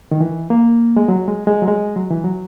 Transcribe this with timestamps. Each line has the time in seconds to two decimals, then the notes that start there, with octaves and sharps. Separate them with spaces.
0.11 D#3
0.20 E3
0.50 A#3
0.96 G#3
1.08 F#3
1.28 G#3
1.47 G#3
1.62 F#3
1.68 G#3
1.96 F#3
2.10 E3
2.24 F#3